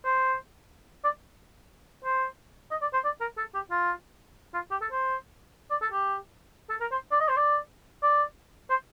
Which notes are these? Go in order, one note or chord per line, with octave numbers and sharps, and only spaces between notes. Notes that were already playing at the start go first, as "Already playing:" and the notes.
C5
D5
C5
D#5
D5
C5
D5
A#4
A4
G4
F4
F4
G4
A4
C5
D5
A4
G4
A4
A#4
C5
D5
D#5
C5
D5
D5
C5